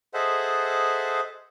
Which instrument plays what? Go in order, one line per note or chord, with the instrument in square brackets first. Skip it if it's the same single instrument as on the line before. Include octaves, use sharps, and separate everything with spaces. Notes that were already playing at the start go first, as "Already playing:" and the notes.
[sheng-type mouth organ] G#4 A4 C5 D#5 E5 F#5